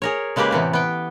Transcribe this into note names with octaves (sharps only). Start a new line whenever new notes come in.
G#4 A#4 C#5
C#3 G#3 A#3 G4 G#4 B4
A2 C3 E3 B3
B3 G5